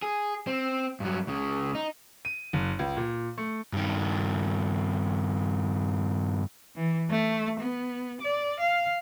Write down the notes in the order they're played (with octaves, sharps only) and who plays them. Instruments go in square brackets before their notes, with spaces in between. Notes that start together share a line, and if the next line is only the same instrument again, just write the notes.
[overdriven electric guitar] G#4
C4
G2 F#3
C#2 C#3
D#4
[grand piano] D#7
F#1
C#2
A#2
A3
[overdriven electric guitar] G2 D#3
[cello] E3
A3
B3
D5
F5